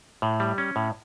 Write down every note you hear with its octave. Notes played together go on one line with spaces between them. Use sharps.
A2
G3
C#4
A2